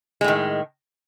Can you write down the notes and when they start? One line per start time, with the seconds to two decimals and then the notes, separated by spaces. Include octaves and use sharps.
0.21 G#3
0.24 A2
0.28 D#3